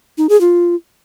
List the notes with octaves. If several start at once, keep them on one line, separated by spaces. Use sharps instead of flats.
D#4
G#4
F4